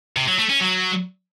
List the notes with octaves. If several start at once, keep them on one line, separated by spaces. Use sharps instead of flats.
C3
F#3
A3
C#4
F#3